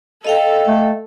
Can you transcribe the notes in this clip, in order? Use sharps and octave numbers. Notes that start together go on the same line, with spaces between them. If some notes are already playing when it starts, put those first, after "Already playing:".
A4 D#5 F5 G5
A3